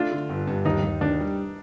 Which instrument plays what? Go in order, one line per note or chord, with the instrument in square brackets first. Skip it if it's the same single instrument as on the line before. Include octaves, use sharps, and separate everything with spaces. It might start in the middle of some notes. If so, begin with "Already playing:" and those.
Already playing: [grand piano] A3 [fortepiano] D4 F4
[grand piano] D3
G1
G2
[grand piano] D#2 [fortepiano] D#4
[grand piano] D#2
[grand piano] D#2 [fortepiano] D4
[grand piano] G3